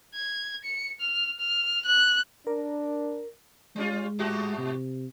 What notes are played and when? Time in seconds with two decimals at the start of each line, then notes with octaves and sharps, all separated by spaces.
0.15 G#6
0.64 C#7
1.01 F6
1.40 F6
1.85 F#6
2.47 D4 A#4 D5
3.76 G3 G#3 C#4 F4
4.19 G#2 F#4 G4
4.58 C3